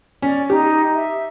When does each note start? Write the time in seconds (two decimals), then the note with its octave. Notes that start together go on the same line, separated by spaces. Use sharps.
0.22 C#4 D5
0.50 D#4 G4
0.94 E5